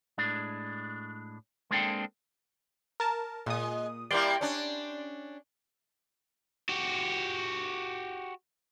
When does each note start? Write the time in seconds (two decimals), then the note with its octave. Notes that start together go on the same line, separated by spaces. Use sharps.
0.18 A2 G#3 D4
1.71 G#3 A#3 C4 D4 A4 G5
3.00 A#4 A5
3.46 A#2 G#3 D#6
4.11 G3 A#3 E4 D5 C6 G6
4.41 C#4 D4
6.69 F#4 G4